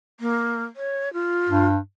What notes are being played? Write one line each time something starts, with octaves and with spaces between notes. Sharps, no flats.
A#3
C#5
F4
G2